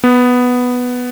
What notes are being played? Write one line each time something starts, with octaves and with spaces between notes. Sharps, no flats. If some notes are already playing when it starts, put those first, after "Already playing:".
B3